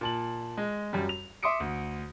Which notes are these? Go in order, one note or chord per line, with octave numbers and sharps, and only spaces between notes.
A#2 A5 F#7
G#3
F#2 G3
F7
E5 C6 D6 D#6 C#7 D7
D2